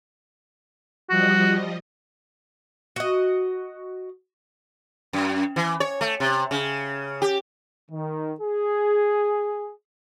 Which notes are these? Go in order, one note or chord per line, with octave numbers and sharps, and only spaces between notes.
F3 G3 F#4 D#5
F#4 D#5
F#2
E3
C#5
A3
C3
C#3
G4
D#3
G#4